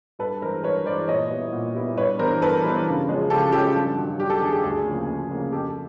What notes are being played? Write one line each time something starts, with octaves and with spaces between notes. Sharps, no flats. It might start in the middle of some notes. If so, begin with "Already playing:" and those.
G2 A4 B4
E3 G#3 A#4 C5
G2 B4 C#5
E3 G#3 C5 D5
A#2 C#5 D#5
G3 B3 E4
A#2
G3 B3 E4
G2 B4 C#5
E3 G3 B3 D4 A#4 C5
G2 A4 B4
E3 G3 B3 D4
C#3
F3 G#3 C#4
C#3 G4 A4
F3 G#3 C#4 G4 A4
G2
D#3 F#3
G2 G4
G4 A4
D#3 F#3 G#4
G4
D2 G#4
C#3 F3 A#3
D2
C#3 F3 A#3
F2 G4 A4